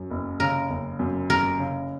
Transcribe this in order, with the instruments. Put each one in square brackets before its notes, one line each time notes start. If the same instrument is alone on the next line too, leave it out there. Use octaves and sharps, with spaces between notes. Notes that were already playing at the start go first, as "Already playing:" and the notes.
Already playing: [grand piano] F#2
F#1
[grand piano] C#3 [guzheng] A#4
[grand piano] F#1
F#2
[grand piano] F#1 [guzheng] A#4
[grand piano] C#3